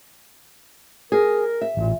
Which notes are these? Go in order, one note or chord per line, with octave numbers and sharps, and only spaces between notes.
G#4 A#4
E5
A1 A#2